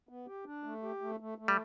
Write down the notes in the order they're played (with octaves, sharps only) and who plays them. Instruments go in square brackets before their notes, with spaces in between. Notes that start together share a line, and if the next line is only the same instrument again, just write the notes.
[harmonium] B3
G4
D4
A3
G4
A3
A3
A3
[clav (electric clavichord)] G3